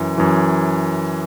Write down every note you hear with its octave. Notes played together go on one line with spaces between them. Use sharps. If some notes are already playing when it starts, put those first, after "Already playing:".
Already playing: F#2 E3
F#2 E3